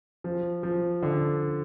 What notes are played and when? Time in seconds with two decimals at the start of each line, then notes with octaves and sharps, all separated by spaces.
0.24 F3
0.63 F3
1.02 D3